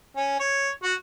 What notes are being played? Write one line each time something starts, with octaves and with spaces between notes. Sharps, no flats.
C#4
C#5
F#4